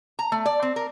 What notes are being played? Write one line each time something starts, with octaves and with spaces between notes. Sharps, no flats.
A#5
A3
D5
C4
A#4